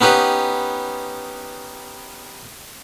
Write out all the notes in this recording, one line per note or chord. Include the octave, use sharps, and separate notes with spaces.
B3 C#4 D#4 G4 B4